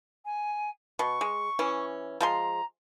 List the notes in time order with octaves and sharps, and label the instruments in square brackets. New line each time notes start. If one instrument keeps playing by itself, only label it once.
[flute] G#5
[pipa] B2 [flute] C#6
[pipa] G#3
E3 C#4
[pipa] F3 G#3 C6 [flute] A#5